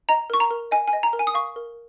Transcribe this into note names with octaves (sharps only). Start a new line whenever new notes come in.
D#5 A#5
A#4 C#6
A#5
A#4
D#5 G#5
G#5
D#5
A#5
A#4
G#5
D#6
F5 C#6
A#4